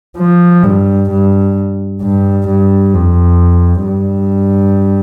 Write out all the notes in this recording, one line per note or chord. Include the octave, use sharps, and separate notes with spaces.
F3
G2
G2
G2
G2
F2
G2